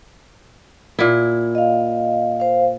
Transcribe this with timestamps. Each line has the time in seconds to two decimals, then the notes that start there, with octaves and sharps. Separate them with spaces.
0.99 A#2 E4
1.55 D#5 F5
2.40 C5 F5